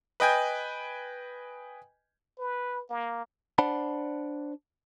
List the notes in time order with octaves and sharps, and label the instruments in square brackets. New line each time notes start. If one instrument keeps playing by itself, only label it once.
[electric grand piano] B4 D#5 G5 G#5 G6
[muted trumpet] B4
A#3
[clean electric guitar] D4 C5 D5 F#5 A5 B5